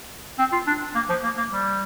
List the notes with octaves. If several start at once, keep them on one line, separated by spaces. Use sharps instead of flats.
C4
F4
D4
A#3
F3
A#3
A#3
G3